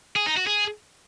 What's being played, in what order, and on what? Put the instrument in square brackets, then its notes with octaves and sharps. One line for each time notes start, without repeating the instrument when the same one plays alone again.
[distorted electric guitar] G#4
D#4
F#4
G#4